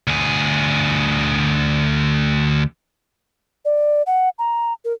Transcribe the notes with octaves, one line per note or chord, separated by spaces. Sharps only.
D2 G#4
D5
F#5
A#5
A#4